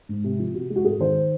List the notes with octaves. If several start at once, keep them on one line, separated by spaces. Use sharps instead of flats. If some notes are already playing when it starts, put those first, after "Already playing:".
G#2
C3
F3
C3 F#4
G#3
F#4
G#2 G#4
D#3 C5